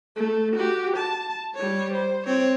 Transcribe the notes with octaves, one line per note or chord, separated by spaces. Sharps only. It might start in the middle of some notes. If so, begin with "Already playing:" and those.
A3
F#4 G4
A5
G3 C#5
C5
C4 C#5